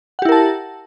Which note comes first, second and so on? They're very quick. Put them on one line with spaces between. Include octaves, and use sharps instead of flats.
F#5 G4 E4 A#4 A5